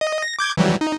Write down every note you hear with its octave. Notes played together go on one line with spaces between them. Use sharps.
D#5
A#6
D6 G6 G#6
E3 F#3 G3
D#4